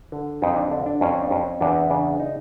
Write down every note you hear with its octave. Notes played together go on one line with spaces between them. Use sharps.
D3
F2 D#4
D4
D3 D4
D4
F2 C#4
D4
F2 C#4
E2 D4
C#3 D4
D#4